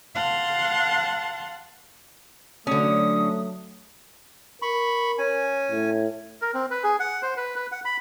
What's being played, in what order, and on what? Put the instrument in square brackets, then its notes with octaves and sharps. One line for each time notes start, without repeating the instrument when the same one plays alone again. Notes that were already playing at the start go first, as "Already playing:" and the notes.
[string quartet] F5 F#5 A5 C6
[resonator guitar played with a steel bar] D3 C#4 [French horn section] F#3 A3 [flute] D#6
[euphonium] A#4 [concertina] B5 C#6
[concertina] C#4 G#5
[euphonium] A2
[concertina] A#4
C4
B4
G#4
F#5
C5
B4
B4
F#5
B5